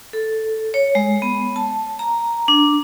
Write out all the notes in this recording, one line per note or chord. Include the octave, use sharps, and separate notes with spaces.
A4
C#5
G#3
B3
A5
A#5
D4